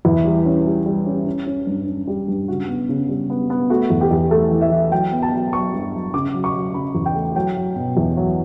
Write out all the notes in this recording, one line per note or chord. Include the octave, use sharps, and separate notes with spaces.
E2 E4
G3
C#4
G3
G3
C#4
C#4
C#4
G2
C#4
G3
G2
C#3 F#4
B3
C#3
G3
B3
B3
A3 F#4
E2
G4
E2
A3 A4
E3
E5
E3
F#3 G5
B3
A5
F#3
F#3 C#6
G2
F#3
C#3 D6
F#3
C#6
F#3
C#3 B5
E2
G5
A3
F#3 G5
F#3
B2
E2
F#3